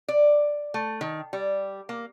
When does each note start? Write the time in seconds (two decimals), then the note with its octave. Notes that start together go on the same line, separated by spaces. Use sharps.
0.08 D5
0.74 A3
1.01 D#3
1.33 G3
1.89 A#3